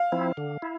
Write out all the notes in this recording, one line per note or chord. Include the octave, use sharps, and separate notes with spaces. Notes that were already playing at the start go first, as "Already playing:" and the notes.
Already playing: F5
F3 C4 E4
D3
E4